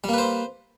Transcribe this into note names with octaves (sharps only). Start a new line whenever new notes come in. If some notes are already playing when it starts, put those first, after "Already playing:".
G3 A#3 B4 C5